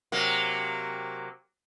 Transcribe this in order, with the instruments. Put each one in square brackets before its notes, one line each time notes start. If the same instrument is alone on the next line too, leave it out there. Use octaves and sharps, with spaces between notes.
[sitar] C3 F#3 A#3